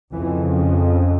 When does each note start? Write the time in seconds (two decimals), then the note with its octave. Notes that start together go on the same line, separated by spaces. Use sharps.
0.12 F2 C#3 E3
0.54 F3